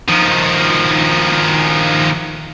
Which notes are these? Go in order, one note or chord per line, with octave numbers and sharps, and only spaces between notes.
D#3 F3